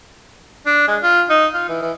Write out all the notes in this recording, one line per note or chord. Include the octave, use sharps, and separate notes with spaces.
D4
G#3
F4
D#4
F4
E3
E3